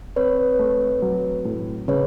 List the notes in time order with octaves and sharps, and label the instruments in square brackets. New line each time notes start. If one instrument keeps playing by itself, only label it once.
[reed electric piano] C4 [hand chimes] B4 C#5
[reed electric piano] A3
F#3
A2
[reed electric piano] C#3 [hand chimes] B4 C#5